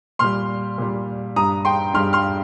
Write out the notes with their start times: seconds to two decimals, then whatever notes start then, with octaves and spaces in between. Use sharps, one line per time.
0.19 A#2 G3 C6 F6
0.78 A#2 G3
1.36 G2 G3 A#5 D#6
1.65 G5 C6
1.94 G2 G3 C6 F6
2.13 C6 F6